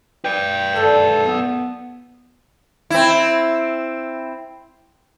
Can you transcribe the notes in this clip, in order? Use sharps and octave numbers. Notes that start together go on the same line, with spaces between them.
B4 D5 G5
G2 D3 D#3 A4
A#2 B3
C4 E4